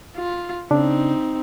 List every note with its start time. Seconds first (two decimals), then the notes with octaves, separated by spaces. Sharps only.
0.16 F4
0.71 C#3 C4 D4 D#4